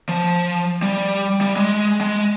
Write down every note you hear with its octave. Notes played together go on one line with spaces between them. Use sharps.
F3
G3
G3
G#3
G#3